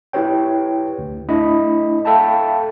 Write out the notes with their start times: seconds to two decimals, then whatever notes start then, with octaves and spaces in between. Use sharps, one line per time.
0.13 E4 G4 B4 C#5 G5
0.99 D2
1.29 A3 D4 E4 D#5 B5
2.05 A4 E5 F5 G5 A5 B5